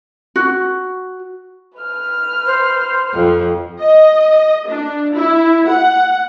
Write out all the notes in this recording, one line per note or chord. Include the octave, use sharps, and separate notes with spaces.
F#4
B4 F6
C5
F2
D#5
D4
E4
F#5